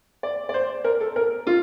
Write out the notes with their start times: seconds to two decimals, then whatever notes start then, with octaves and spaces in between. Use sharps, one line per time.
0.23 D5
0.49 D5
0.54 C5
0.84 A#4
1.01 A4
1.16 A#4
1.47 F4